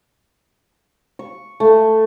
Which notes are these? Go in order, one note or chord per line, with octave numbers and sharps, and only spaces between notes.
C#6
A3